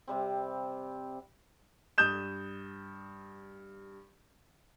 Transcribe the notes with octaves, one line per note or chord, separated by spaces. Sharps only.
C3 G3 C4
G2 D#6 G6 E7